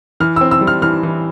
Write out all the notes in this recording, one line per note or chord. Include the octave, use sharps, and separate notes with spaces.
E3 F6
C4 E6
E6
G3
F6
E3 F6
E3